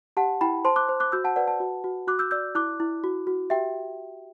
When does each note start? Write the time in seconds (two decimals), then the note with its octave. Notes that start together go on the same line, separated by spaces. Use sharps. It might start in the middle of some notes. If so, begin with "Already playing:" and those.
0.17 G4 F#5 A5
0.41 E4 G5 B5
0.65 C5 A5 C6
0.76 D6 F#6
0.89 C5
1.00 D6 F#6
1.12 F#4 E6 G6
1.24 F#5 A5
1.36 B4 D5 F#5
1.48 F#5 A5
1.60 F#4
1.84 F#4
2.07 F#4 D6 F#6
2.19 E6 G6
2.31 D5 E6 G6
2.55 E4 D6 F#6
2.80 E4
3.04 F#4
3.27 F#4
3.50 G4 E5 G5